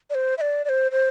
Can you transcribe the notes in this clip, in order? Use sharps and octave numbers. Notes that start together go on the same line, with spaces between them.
D5
C5
E5
D5
D5
C5
C5